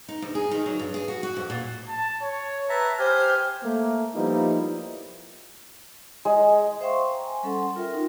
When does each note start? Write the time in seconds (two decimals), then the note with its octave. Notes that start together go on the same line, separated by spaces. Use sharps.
0.09 D#4
0.22 D2
0.35 G#4
0.51 D#3
0.66 F#3
0.79 G2
0.94 G#4
1.08 F#4
1.23 F#4
1.37 F2
1.50 A#2
1.89 A5
2.22 C#5
2.69 B4 E5 A5 A#5
2.99 G4 C5 G#5 F6
3.63 A3 A#3
4.15 F3 G3 A#3 B3 D#4 E4
6.25 G#3
6.81 C5 E5 F5 G5 C6 C#6
7.10 A#5
7.26 G#5
7.43 G3 C#4 A4 F#5 C6
7.76 F4 A#4 E5 G5
7.94 D#4